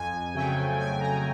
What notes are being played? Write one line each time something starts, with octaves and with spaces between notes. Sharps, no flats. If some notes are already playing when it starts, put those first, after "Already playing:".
Already playing: F2 G#5
C#3 F#3 A3 G5
F2 G#5
A#5